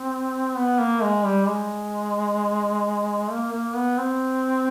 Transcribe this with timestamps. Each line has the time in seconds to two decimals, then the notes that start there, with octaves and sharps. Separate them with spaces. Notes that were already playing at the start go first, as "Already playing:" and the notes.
Already playing: C4
0.56 B3
0.79 A#3
1.03 G#3
1.25 G3
1.48 G#3
3.31 A#3
3.53 A#3
3.76 B3
3.98 C4